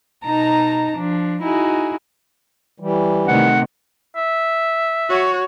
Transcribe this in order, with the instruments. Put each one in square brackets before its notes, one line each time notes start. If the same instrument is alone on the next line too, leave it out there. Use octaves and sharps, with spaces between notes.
[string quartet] B2 D#4 A5 A#5
F3 D4
D#4 E4 F#4 G#4
[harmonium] E3 G3
[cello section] C3 D#3 A3 [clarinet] F#5
[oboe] E5
[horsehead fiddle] F#4 C#5